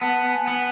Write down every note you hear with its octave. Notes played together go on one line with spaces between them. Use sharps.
B3 A5
G#5
B3